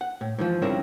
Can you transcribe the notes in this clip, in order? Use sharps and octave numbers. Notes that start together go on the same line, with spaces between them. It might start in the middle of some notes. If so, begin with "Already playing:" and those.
F#5
A2
G#2 E3 F3
G2 C#3 C4 E4 A#4